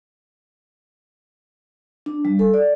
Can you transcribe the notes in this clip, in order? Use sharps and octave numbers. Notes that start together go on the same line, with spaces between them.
D4
G3
A4
D5